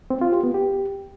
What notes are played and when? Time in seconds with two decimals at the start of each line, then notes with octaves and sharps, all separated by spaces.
0.10 C4
0.21 F4
0.32 G4
0.43 B3
0.54 G4